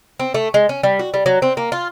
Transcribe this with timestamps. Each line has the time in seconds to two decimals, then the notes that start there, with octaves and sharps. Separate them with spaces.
0.20 C4
0.34 A3
0.54 G#3
0.69 C#4
0.83 G3
0.99 F#4
1.14 G3
1.26 F#3
1.42 C4
1.57 A#3
1.72 F4